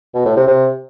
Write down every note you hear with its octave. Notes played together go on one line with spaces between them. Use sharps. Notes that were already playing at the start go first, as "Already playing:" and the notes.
B2
A2
C3
C3